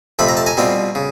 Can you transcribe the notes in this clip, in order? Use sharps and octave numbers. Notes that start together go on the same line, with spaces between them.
F2 C3 F3 A3 B5
A#5
A5
G#5 A#5
B2 G3 C4 F4
C#3